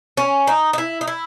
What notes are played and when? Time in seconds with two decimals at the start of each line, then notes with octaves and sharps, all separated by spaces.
0.17 C#4
0.47 D#4
0.73 D#4
0.78 E4
1.01 D#4
1.07 E4